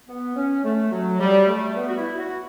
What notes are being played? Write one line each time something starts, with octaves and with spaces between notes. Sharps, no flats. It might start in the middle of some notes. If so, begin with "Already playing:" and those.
B3
C#4
A3
F#3
G3
A3
B3
F#4
E4
F#4